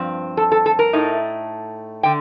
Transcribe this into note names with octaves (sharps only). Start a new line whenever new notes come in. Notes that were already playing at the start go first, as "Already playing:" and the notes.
Already playing: G2 F3 C4
A4
A4
A4
A#4
A2 A3 D#4
D3 G5